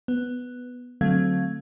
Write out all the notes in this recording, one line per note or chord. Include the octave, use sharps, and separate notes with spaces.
B3
D3 F#3 A3 C4 F5 G#6